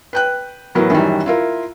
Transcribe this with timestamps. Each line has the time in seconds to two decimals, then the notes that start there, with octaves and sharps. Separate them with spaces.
0.13 B4 G5 F#6
0.75 A2 E3 F#3 B3 A#4
0.90 F#2 D#3 E3 F#3 G3
1.26 E4 F4 A#4